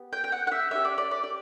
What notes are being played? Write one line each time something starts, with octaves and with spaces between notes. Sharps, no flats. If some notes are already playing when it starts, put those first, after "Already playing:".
Already playing: B3 G4
G5
G5
F#5
F#5
E5
C#4 E4 G4 E5
D5
D5
D5
D5